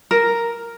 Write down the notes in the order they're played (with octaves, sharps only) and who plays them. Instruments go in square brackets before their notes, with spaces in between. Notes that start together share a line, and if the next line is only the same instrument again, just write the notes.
[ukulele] A#4